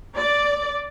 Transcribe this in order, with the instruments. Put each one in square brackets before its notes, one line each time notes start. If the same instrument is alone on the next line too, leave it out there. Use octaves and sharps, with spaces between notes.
[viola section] D5